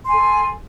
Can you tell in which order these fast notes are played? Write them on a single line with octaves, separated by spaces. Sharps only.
C6 G#5 A4